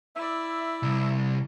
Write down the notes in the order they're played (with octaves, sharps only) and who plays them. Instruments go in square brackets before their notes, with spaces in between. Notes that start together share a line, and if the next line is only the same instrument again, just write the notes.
[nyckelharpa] E4 D5 [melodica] E5
[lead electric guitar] C2